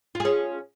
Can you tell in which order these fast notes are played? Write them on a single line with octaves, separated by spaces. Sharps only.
F4 G#4 C#4